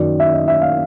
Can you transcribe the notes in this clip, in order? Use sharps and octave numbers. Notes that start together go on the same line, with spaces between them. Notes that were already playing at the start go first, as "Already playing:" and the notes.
Already playing: F#2 D#3 F#3 D5
E5
D#5
E5
F5